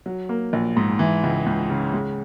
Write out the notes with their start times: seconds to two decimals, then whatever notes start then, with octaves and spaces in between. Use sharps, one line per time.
0.06 F#3
0.29 A#3
0.53 A#1
0.77 G#2
0.99 E3
1.23 C#2
1.46 C#2
1.70 C#3
1.93 G#3